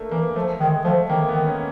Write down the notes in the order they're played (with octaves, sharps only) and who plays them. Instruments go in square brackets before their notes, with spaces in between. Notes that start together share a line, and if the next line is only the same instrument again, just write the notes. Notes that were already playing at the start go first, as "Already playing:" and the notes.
Already playing: [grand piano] A3 A#3 D4
[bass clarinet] E3 [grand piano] A#3
[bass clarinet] F3 [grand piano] A3
[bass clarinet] D#3 [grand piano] G#3
[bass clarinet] F3 [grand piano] A3
[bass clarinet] D#3 [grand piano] A#3
[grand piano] B3
[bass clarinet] D#3
[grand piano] C#4